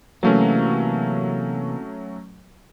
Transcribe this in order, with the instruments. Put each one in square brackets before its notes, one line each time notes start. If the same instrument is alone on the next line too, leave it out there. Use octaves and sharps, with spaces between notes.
[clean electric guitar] C3 E3 A#3 [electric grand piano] F#3 A3 C#4